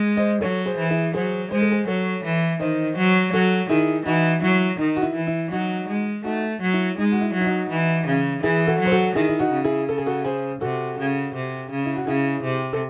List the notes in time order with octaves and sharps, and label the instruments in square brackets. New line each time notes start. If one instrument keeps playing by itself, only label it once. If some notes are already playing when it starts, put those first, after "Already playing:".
Already playing: [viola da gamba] G#3
[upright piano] C5 D#5
[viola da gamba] F#3 [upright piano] A4 C#5
[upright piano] G#4 C5
[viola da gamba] E3
[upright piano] E4 G#4
[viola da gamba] F#3 [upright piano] G#4 C5
[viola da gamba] G#3 [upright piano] C5
[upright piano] A4
G#4 C5
[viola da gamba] F#3 [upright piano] A4 C#5
[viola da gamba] E3
[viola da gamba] D#3 [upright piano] C5 D#5
[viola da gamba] F#3
[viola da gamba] F#3 [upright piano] F#4 A4
[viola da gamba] D#3 [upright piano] E4 G#4
[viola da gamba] E3 [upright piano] D#4 F#4
[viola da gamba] F#3 [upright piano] E4
[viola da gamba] D#3 [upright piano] D#4
[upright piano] F#4
E4
[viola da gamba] E3
[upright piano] E4
[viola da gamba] F#3 [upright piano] D#4 F#4
[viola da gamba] G#3
[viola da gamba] A3 [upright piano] D#4 F#4
[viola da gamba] F#3
[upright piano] E4
[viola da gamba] G#3 [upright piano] D#4
[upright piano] F#4
E4
[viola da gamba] F#3
[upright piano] E4
D#4 F#4
[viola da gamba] E3
C#3
[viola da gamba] E3 [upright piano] E4 G#4
[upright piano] F#4 A4
[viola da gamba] F#3
[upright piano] C5
F#4 A4
[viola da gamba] D#3 [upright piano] E4 G#4
[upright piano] E4
D#4 F#4
[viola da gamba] C#3
[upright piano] E4 G#4
A4
G#4
F#4 A4
G#4 C5
[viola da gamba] C3 [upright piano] F#4 A4
[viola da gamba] C#3
C3
C#3
[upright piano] E4
F#4
[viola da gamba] C#3 [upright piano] E4 G#4
[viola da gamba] C3
[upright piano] A4